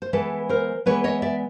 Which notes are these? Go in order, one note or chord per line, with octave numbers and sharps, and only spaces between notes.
C5
E3 G#3 B3 A4 B4
A#4 C5
E3 G#3 B3 B4 C#5
C#5 D#5
D5 E5